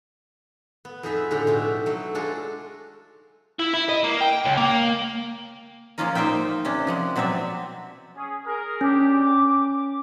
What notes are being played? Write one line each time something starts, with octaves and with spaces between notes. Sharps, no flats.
B3
F2 D#4 G#4 B4 E5
A2 D3 G#3 G4 A#5
B2 D#4 F#4 E5
F#3 A3
G#3 D4 F4 F#4 G#4 A4
E4
E4
D#5
A#3
G5
C#2
A#3
F3 G#3 A#3 C#4 F4 A#4
A#3 D#4 C5 E5 G5
C3 C#4 D4
F3 G#3 F#5
B2 F#3 C4 D4 E5
C#4 G#4
G#4 A#4
C#4 D4 G4
D6